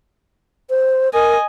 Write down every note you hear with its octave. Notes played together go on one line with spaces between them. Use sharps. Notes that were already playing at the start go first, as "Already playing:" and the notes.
C5
A#4 D#5 G#5